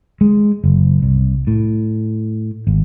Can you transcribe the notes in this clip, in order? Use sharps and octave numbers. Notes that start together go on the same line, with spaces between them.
G#3
F#1
C2
A2
G#1